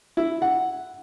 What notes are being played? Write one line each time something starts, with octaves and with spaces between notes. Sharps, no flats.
E4
F#5